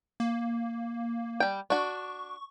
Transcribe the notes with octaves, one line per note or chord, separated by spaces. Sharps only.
A#3
G3 G5
D4 F#4 C#6